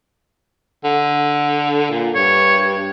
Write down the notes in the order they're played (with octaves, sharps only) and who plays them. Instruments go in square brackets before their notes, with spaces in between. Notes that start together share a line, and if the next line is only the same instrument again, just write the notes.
[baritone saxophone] D3
A#2
[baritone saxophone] G2 [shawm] C#5